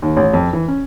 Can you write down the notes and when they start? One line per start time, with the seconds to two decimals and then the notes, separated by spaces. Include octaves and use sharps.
0.02 D#2
0.17 A1
0.33 F2
0.53 E3
0.68 C#4